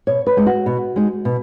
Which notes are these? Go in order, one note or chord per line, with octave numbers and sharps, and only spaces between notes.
B2 C#5
B4
G#3 D#4
F#4
B2
G#3 D#4
B2